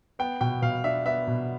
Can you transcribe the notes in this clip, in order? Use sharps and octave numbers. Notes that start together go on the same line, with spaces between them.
B3 G5
B2 G5
B2 F5
D4 E5
B3 E5
B2